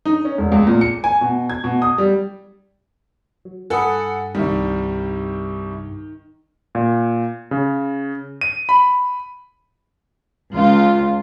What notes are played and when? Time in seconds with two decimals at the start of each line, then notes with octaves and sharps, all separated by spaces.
0.05 D#4
0.25 C#4
0.38 E1
0.52 C#2
0.67 A#2
0.81 C#7
1.04 G#5
1.21 B2
1.50 G#6
1.64 B2
1.82 D#6
1.98 G3
3.45 F#3
3.70 G2 A4 F#5 G#5 B5 D#6
4.35 C2 D#3 G3
6.75 A#2
7.51 C#3
8.41 D#7
8.69 B5
10.54 C#2 F4